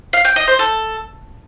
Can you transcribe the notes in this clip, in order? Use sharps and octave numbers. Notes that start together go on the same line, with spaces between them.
F5
G5
D#5
C5
A4